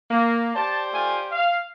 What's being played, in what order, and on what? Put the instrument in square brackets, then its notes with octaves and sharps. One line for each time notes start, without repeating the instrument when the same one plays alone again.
[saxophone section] A#3
[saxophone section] G4 C5 D5 [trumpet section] A5
[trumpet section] A3 F4 G#5
F5